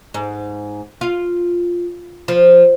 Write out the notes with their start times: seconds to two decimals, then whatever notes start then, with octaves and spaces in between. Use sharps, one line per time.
0.14 G#2
1.01 F4
2.28 F3